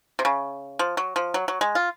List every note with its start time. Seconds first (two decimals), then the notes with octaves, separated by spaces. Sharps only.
0.19 C3
0.25 C#3
0.79 F3
0.97 F#3
1.16 F3
1.34 F#3
1.48 F#3
1.61 G#3
1.75 F4